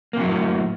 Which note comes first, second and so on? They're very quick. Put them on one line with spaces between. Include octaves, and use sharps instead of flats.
A#3 C3 F#3 F#2 A2